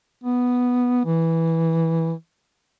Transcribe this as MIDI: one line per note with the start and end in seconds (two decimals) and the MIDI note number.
0.23 1.04 59
1.05 2.12 52